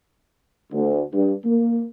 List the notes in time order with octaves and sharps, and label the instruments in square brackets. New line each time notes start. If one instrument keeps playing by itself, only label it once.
[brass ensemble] D2
G2
A#3